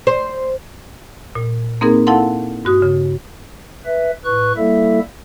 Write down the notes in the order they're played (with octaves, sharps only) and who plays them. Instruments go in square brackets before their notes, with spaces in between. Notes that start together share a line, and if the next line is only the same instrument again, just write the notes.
[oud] C5
[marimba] A#2
A#3 C4 D#4 G#4 A#4
E4 A4 F5 F#5 A5 C6
G2 F#4 D#6
C#3
[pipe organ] B4 E5
A2 B4 C#6 F#6
G3 A#3 E4 A4 E5